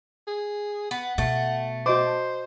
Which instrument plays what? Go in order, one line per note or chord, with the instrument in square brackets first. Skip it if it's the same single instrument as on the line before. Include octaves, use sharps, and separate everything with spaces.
[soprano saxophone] G#4
[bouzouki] B3 [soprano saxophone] F#5
[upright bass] B2 [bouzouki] A3
[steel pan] F#4 D#5 D6 [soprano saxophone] C5